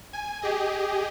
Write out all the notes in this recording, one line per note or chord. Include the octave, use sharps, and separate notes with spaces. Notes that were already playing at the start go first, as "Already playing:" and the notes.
G#5
G4 G#4 D#5